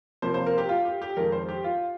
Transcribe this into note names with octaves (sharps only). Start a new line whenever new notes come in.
C3 F3 A#3 C5
C5
A#4
G4
F4
G4
G4
F2 D#3 G#3 A#4
C5
G4
F4